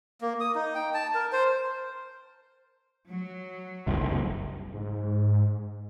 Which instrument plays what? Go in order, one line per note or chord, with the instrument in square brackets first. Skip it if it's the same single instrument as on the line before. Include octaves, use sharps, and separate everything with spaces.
[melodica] A#3
D#6
D#4
G5
A5
A#4
C5
[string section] F#3
[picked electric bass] F#1 C2
[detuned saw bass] G#2